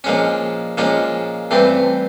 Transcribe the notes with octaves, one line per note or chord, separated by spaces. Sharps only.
A#2 F3 G#3 C#4
A#2 F3 G#3 C#4
G2 E3 A3 C4